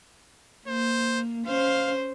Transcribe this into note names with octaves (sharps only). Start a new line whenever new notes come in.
A#3 C5
C#4 C5 F5